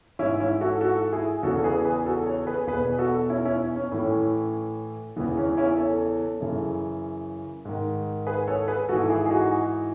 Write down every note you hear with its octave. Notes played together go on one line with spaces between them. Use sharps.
G#2 E3 C#4 E4
C#4 E4
F#4 A4
F#4 A4
E4 G#4
E2 C#3 E3 F#4 A4
G#4 B4
G#4 B4
F#4 A4
A4 C#5
G#4 B4
E2 B2 G#4 B4
F#4 A4
C#4 E4
C#4 E4
C#4
A2 E3 C#4
E2 C#3 E3 B3
C#4
C#4 E4
A4 C#5
F#2 C#3 E3
G#2 D#3
G#4 B4
A4 C#5
G#4 B4
G#2 E3 F#4 A4
E4 G#4
G#4
D#4 F#4